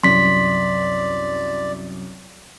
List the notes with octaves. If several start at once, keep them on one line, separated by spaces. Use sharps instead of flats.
C2 F#2 D5 C6 B6